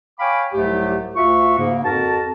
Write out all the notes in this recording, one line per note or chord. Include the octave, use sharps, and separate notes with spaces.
C#5 F5 G5 G#5 B5 D6
C2 G#2 F#3 A3 G4
D2 F4 F#4 E5 C#6
G#2 C#3 A#3
F2 F#4 A#4 A5